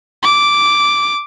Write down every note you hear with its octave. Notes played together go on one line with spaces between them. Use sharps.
D6